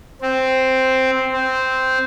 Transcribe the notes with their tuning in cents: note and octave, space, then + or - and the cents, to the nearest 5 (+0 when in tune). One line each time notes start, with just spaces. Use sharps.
C4 +0
C4 -5